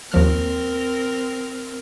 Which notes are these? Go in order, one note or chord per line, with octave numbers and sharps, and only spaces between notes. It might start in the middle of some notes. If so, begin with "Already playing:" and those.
D#2 F3 C4 A#4 F6